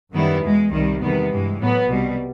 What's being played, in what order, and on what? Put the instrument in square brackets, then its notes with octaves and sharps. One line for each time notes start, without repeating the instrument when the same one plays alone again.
[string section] F#2 D#3 G3 B3 E4
E2 B2 G#3
C2 C3 D#3 G3
E2 C3 D#3 G3 B3
G2 E3 G#3
A2 F#3 B3
C2 B2 G3